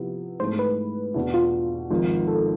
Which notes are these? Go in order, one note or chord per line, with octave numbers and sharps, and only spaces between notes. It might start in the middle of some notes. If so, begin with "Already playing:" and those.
Already playing: C3 F3 B3 E4
G#2 E3 A3 C5
B4
E2 B2 B3 D4 E4
F4
G#1 G#2 F3
A4